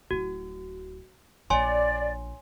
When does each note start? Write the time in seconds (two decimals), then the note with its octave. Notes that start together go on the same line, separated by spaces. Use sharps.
0.11 D1 E4 F#4
1.50 A#1 D4 C#5 D5 G#5 C6